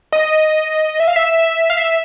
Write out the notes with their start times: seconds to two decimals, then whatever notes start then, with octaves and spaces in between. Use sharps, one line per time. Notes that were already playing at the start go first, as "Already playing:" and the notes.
0.13 D#5
1.00 E5
1.08 F5
1.16 E5
1.70 F5
1.77 E5